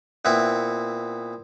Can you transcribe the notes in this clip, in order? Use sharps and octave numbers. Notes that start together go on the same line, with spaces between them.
A#2 B3 C4 E4